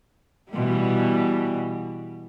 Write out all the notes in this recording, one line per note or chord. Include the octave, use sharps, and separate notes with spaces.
B2 E3 G3